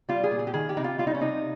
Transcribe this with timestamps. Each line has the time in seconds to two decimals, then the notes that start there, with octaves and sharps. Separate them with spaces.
0.09 G3 F4
0.24 G#4
0.31 A#2
0.39 G#4
0.47 G4
0.54 D#3 G#4
0.69 G4
0.77 C3 D#4
0.84 F4
0.98 G3 F4
1.07 D#4
1.15 C#4
1.21 C3 D#4